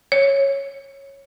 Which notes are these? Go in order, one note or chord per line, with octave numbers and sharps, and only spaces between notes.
C#5